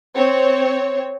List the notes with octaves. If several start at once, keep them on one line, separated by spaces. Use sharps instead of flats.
C4 C#5